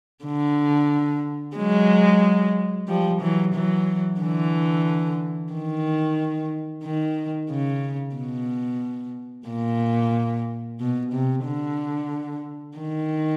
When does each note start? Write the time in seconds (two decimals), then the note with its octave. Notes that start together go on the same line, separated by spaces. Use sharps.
0.25 D3
1.56 F#3 G#3
2.88 F3 G3
3.21 E3 F#3
3.54 E3 F#3
4.20 D3 E3
5.53 D#3
6.84 D#3
7.51 C#3
8.16 B2
9.48 A#2
10.80 B2
11.12 C3
11.45 D3
12.77 D#3